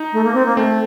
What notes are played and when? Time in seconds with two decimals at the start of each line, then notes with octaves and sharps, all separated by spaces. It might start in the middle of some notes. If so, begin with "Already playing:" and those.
Already playing: D#4
0.13 A3
0.24 A#3
0.34 C4
0.46 A#3
0.57 A3 C4